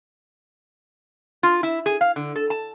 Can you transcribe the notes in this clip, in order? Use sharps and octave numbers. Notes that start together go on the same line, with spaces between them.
F4
E4
G#4
F5
D3
A4
A5